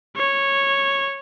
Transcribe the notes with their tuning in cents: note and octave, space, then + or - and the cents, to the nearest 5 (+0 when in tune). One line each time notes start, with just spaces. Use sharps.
C#5 -10